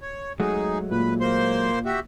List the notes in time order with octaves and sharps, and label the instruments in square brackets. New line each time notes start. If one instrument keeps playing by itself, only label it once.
[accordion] C#5
[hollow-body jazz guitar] F#3 G#3 A3 [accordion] D#4 G#4
[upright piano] A#2 [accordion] B4
[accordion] A#3 C5 C6
F#4 G4 E5